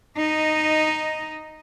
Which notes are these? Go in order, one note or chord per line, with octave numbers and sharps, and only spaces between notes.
D#4 D#5